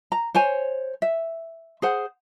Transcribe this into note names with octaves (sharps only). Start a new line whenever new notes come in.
A#5
C5 C#5 G#5
E5
G#4 C5 F#5